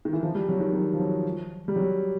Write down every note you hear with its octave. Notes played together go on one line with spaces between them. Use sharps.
D#3
E3
F3
G3
F#3
D#3
F#3
F3
F#3
G3
F#3